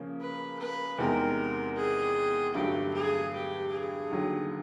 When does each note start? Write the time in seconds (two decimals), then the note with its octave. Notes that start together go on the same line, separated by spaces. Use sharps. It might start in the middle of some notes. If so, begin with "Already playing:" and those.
Already playing: C#3 F3 A#3 C#4
0.20 B4
0.59 B4
0.98 E2 C3 D#3 G#3 C4 A#4
1.77 G#4
2.54 G2 D3 F#3 A3 G4
2.94 G#4
3.33 G4
3.72 G#4
4.11 D#2 D3 F#3